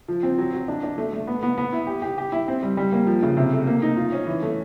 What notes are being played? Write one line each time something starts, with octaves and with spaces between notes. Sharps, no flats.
F3
C4
F#3
F#3
D4
D4
A3
A3
B3
B3
B3
E4
G4
G4
G4
E4
C4
G3
G3
A#3
F3
C#3
C3
A3
A#3
D#4
F4
C#4
E3
A3